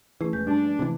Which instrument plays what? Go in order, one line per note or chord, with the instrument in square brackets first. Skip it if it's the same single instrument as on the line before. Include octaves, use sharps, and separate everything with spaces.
[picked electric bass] E3 [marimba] A3 C#4 G#4
[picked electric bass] E1 [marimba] G#3 B4 G6
[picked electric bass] G2 [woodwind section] D4
[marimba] F3 D5
[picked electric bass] C3 E3